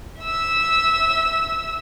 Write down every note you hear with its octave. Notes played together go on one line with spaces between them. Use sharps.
E5 E6